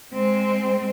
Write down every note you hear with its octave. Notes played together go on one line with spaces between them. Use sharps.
G#3 C4